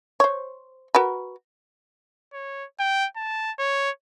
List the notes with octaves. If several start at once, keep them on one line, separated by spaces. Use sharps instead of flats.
C5 C#5
F#4 A#4 B4
C#5
G5
A5
C#5